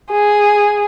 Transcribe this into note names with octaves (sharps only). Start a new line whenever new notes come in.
G#4